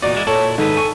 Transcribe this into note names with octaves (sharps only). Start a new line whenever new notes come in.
E2 A#2 D#4 F#4 D5
G#3 E4
A#2 E4 A4 C#5
G#2 D#3 G#4 A4 B4
G#5 C#6